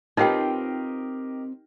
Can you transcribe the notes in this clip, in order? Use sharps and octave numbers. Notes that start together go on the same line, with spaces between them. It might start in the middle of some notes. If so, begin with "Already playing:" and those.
C4 D#4 F4 G4 A#4 B4 D#5 G5